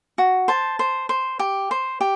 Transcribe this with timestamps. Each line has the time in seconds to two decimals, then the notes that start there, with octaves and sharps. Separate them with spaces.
0.18 F#4
0.48 C5 A5
0.79 C5
1.09 C5
1.39 G4
1.71 C5
2.01 G4